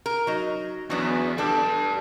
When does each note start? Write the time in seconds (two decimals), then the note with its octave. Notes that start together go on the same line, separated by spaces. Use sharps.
0.06 A#4
0.27 F#3 D#4
0.90 E2 F#3 B3 D4
1.38 G3 D4 G4 A4 A5